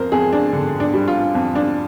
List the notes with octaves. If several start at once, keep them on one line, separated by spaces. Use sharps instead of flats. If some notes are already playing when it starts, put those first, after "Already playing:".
Already playing: F2 A#4 C5
F2 G#4
D4
D3
D4
G3
F4
F2
D4